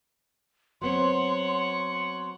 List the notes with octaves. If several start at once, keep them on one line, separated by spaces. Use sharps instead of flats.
F#3 B3 C4 C#5 F#5 C6